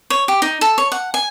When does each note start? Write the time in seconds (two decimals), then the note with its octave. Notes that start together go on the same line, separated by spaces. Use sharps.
0.10 C#5
0.28 G4
0.42 D#4
0.61 A4
0.78 C#5
0.92 F#5
1.14 G#5